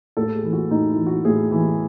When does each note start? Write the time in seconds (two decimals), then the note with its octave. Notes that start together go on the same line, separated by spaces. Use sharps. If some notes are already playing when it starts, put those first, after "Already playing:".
0.17 A2 A4
0.35 G#4
0.44 E3
0.53 F#4
0.70 A2 D#4
0.89 E4
0.97 E3
1.06 F#4
1.25 A2 G#4
1.51 E3